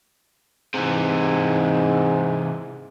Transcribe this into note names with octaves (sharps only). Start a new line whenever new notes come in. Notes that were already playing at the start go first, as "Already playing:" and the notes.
G#2 C3 E3